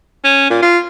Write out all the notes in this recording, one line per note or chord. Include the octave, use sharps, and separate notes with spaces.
C#4
A#2
F4